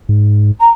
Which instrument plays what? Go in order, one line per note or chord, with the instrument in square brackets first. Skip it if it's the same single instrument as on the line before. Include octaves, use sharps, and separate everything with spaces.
[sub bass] G#2
[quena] A#5